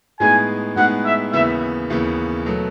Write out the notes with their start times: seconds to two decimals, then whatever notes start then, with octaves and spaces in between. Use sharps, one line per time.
0.20 A2 G#3 B3 D#4 G#4 G#5
0.76 A2 G#3 B3 D#4 G#4 F#5
1.05 E5
1.33 D#2 C#3 E3 B3 E5
1.90 D#2 C#3 E3 B3
2.46 B2 F#3 A3